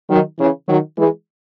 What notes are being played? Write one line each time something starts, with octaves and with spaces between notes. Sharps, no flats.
D#3 F#3
C#3 E3
D#3 F#3
E3 G#3